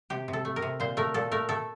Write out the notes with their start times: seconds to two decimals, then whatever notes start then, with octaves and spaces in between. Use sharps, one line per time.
0.10 C3 G4
0.28 C3
0.33 A4
0.45 A3
0.56 A#4
0.62 C3
0.80 A#2 C5
0.97 A3 A#4
1.14 A#2 A4
1.31 A3 A#4
1.49 A3 A4